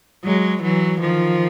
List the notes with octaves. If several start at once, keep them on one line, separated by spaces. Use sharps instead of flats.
F#3 G#3
E3 F#3
D#3 F3